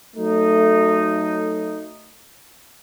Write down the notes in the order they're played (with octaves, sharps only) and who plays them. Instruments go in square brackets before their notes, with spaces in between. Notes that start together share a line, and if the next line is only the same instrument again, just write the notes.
[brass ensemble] F#3 A3 D#4